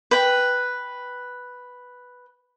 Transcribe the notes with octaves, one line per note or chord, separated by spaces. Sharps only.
B4 G5